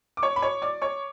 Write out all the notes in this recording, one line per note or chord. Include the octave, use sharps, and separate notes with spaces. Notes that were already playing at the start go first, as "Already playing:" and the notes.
D6
C#5 C#6
B5
C#5 C#6
D5 D6
C#5 C#6